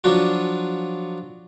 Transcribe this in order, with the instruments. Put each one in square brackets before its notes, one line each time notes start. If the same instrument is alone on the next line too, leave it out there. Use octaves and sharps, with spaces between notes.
[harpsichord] F3 F#3 D4 F4 F#4